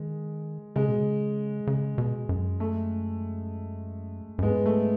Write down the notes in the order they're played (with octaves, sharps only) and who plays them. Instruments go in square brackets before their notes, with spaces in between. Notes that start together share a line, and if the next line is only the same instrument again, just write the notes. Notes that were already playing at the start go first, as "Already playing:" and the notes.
Already playing: [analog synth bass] D#3 [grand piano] G#3
[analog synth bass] C#3 [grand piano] G#3
[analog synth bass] B2
C#3
C#3
B2
F#2
[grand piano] A3
[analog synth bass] F#2
[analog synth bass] G#2 [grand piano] G#3 B3
[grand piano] A3